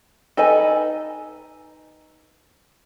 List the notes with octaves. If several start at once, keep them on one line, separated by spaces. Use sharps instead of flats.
D#4 A4 B4 D#5 G#5